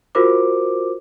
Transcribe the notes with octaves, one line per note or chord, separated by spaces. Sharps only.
F4 F#4 A#4 C5 D6